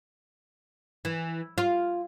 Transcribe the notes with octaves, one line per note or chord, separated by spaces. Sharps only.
E3
F4